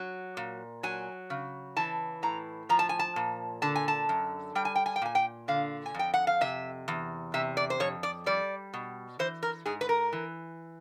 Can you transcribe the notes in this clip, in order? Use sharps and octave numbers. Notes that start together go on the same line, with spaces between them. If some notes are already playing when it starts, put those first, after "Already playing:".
Already playing: F#3
A#2
F#3 G#5
C#3
E3 A5
A2 A#5
F3 A#5
A5
G#5
A5
A#2
D3 A5
G#5
A5
F#2
G3 G5
G#5
G5
G#5
G5
A#2 G#5
G5
D3 F5
G#5
F2 G5
F#5
F5
C3 E5
E2
C3 E5
D5
C5
F2 C#5
D5
G3 D5
B2
E3 C5
A#4
G#2 G#4
B4
A#4
E3